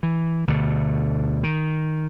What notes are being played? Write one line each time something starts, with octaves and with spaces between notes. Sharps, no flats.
E3
D2 B2 D3
D#3